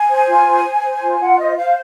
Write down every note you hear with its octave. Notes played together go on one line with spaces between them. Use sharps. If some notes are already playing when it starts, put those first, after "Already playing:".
Already playing: G#5
C5
F4
C5
C5
C5
F4
F4 F#5
C5 D#5
C5 F5